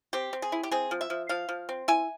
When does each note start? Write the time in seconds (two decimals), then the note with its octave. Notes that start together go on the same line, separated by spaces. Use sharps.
0.13 C4 G4
0.33 C4
0.42 G#4
0.52 E4
0.63 G4
0.71 C4 G#4
0.91 F3
1.01 E5
1.10 F3
1.29 F3 F5
1.49 F3
1.69 C4
1.88 E4 G#5